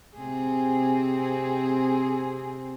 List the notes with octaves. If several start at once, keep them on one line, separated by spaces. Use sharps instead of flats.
C3 C4 G#4